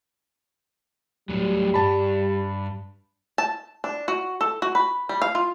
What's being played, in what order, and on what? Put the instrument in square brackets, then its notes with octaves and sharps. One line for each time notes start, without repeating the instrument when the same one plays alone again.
[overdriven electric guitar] A2 F#3 [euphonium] G3
[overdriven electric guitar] G2 [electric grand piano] A5 B5
[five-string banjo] A5
D4
F#4
A4
F#4
B4
G3
F5
F4